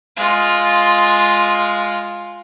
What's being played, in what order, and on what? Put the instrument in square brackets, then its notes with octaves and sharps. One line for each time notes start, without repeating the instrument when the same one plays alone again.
[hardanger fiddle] G#3 F4